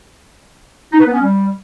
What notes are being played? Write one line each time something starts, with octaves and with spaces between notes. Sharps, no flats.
D#4
B4
B3
C#4
G3